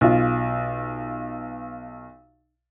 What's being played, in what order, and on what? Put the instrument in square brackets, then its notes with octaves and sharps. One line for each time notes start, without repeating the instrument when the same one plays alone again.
[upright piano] B1 F4